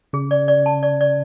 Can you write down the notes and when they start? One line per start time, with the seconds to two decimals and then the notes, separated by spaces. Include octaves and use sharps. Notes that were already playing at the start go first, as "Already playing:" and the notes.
0.13 C#3 G#4
0.31 D5
0.48 D5
0.66 A5
0.83 D5
1.01 D5